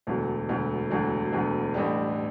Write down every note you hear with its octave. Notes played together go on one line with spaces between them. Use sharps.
E1 D2 D3 F#3
E1 D2 D3 F#3
E1 D2 D3 F#3
E1 D2 D3 F#3
A1 A2 G3 D4 G4